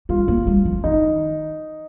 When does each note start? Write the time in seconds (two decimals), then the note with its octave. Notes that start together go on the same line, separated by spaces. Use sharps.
0.09 G3 F4
0.28 A#3
0.47 G3
0.65 F3
0.84 D#3 D#4